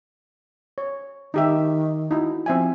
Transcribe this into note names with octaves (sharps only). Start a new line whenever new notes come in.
C#5
D#3 D#4 G4 E5
D#4 E4 F#4
F3 C4 E5 G#5